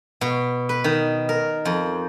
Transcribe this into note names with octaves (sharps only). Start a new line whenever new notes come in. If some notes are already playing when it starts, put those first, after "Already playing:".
B2
B4
D#3
A#4
F2